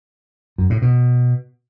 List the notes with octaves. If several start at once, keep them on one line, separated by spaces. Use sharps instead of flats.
F#2
A2
B2